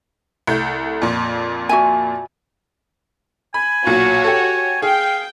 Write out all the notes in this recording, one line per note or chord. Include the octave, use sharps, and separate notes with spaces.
C2 A3 G6
F2 A#2
F#4 E5 G#5
G#5 B5
B1 A#2 F#4 C#5
G4 A4 G#5
G#4 F5 G5